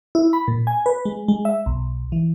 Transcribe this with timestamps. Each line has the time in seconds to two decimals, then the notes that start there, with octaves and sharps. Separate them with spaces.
0.15 E4
0.33 B5
0.48 A#2
0.67 G#5
0.86 B4
1.05 G#3
1.28 G#3
1.45 E5
1.66 B1
2.12 E3